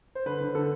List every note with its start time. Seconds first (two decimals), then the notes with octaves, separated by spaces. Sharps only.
0.15 C5
0.26 D3 B4
0.41 D3
0.55 D3 A4